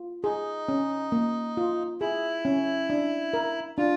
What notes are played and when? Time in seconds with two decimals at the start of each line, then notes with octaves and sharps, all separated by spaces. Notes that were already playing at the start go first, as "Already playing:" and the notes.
Already playing: F4
0.24 D#4 G#4
0.68 C#4
1.12 A#3
1.57 F4
2.01 E4 G#4
2.45 C#4
2.90 D4
3.33 A#4
3.78 D4 F4